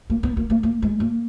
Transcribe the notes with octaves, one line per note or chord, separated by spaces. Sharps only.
A#3
B3
A#3
A#3
A#3
G#3
A#3